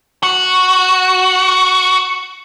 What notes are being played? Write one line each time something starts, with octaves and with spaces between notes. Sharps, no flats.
F#4 C#6